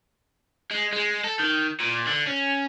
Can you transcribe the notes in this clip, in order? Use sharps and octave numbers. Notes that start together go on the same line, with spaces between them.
G#3
G#3
A4
D#3
A#2
D3
C#4